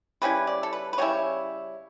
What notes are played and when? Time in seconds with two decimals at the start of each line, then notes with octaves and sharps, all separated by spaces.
0.22 C#3 G3 C#4 E4 B4
0.47 D5
0.63 A4
0.73 B4
0.93 B4
0.98 C#3 G3 C#4 E4 C#5